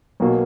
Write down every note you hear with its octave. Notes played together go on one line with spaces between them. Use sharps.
B1 B2 F#3 A#3